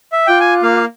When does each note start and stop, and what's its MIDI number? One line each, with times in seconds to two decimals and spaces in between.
0.12 0.27 76
0.27 0.81 65
0.27 0.39 79
0.27 0.81 86
0.27 0.81 90
0.40 0.54 80
0.63 0.85 58
0.63 0.85 77